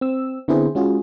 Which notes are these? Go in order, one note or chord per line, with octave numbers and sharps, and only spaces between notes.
C4 E6
D3 B3 C4 E4 G#4 C5
G#3 C#4 F4 F#4 G#4